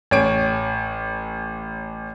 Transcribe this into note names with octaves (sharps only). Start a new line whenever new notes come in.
A1 C#5 D7